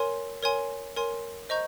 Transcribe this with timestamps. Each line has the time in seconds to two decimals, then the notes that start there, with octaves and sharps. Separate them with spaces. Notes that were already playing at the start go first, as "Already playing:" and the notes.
Already playing: A#4 C#5 G#5 C6
0.43 A#4 C#5 G#5 C6
0.96 A#4 C#5 G#5 C6
1.49 C5 D#5 A#5 C#6 G6